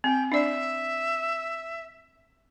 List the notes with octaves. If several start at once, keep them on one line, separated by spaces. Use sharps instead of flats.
C4 G5
D4 D5 E5